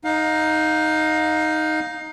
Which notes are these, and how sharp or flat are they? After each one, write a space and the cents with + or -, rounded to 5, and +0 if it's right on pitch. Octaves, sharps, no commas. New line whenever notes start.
D#4 +5 F5 +30